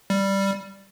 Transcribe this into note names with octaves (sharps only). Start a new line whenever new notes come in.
G3